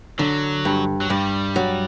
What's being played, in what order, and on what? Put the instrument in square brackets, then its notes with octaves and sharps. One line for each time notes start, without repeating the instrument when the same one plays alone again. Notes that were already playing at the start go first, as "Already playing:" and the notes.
[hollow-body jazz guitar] D3 [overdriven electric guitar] F#3
[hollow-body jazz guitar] G2
[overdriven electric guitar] F#3
[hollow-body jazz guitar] G2 [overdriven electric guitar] G3
[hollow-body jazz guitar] F#3